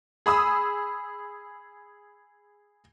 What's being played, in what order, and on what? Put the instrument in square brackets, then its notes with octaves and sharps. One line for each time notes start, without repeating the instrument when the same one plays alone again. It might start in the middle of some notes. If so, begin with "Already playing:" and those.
[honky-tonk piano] G#4 B5 D#6 E6